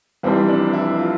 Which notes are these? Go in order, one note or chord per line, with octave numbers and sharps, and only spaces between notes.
F1 F2 E3 G3 C4
D4
E4
F4